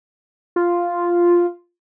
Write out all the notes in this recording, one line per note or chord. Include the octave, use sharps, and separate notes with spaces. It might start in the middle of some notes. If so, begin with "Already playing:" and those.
F4